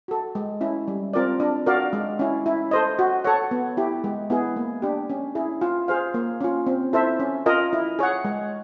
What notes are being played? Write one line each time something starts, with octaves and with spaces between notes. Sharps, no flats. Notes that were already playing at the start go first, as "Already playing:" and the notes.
F#4 A4
G#3
C#4 E4
G3
C4 F4 A#4 D5
D4
F#4 A#4 D5 F5
G#3
C#4 E4
E4
A4 C5 D#5
F#4
A4 C#5 F#5
B3
E4 G4
G#3
B3 E4 G#4
A#3
D4 G4
C#4
E4 G#4
F4
G#4 C5 F5
A#3
C#4 F4
C4
E4 A4 C5 E5
C#4
F4 A#4 D#5
E4
G#4 C#5 F#5
G#3